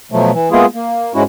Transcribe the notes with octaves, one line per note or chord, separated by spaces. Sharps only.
B2 F3 F#3 A3
E3
G#3 A#3 B3 E4 F4 G#4
A#3
G#2 G#3 C#4 E4 F#4